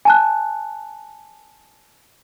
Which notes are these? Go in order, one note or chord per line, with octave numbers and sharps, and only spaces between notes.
G#5 A5 F#6